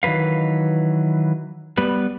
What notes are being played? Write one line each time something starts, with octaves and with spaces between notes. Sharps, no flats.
D#3 E3 F#3 B4 F5
G3 B3 B4